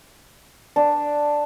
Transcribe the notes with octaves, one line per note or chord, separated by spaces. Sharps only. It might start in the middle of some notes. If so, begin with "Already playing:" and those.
D4